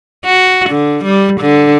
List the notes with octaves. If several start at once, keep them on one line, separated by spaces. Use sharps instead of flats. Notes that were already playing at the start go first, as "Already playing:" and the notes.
F#4
D3
G3
D3